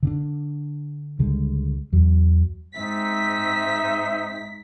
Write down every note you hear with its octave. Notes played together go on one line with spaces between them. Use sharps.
D3 C#4 D4
C#2 D3 G3 G#3
E2 F#3
G#2 C4 D#4 E5 B6